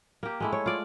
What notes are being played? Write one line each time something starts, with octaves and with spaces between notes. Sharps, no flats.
A#3 G4
G#3 A3 E4
C#5
F4 D5